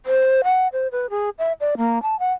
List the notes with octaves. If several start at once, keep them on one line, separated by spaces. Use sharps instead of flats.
C5
F#5
C5
B4
G#4
E5
D5
A#3
A5
F#5